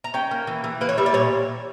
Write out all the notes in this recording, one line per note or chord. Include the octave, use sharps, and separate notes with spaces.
A#5
C#4 G5
A#3
E3
E3
A#3 B4
C#5
G3 E5
D5
A#2 C#5